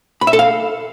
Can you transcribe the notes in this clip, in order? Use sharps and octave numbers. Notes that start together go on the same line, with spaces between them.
B5
E5
A4
F5